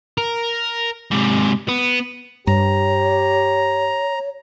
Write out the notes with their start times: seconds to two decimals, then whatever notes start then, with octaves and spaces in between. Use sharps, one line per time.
0.18 A#4
1.11 G#2 C3
1.68 B3
2.47 G2 G4 C#5 A#5